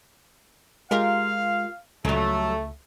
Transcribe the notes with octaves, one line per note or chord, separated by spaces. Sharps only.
G#3 F4 G4 A#4 F5
C#2 F#3 G3 A3 A4